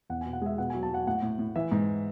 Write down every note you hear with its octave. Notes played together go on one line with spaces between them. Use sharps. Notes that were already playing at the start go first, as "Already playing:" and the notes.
E2 F#5
G#5
B2
F#5
G#3 E5
B2 F#5
G#5
F#3
A5
F#3 F#5
A2 F#5
A2
A2
E3 E5
G#2